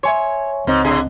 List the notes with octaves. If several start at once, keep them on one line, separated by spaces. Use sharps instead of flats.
C#5 E5 G#5 C6
C#2 G#2 C4 D#5
A2 D3 G#4